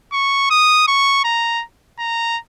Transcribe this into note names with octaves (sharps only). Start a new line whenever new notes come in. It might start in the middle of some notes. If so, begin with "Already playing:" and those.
C#6
D#6
C#6
A#5
A#5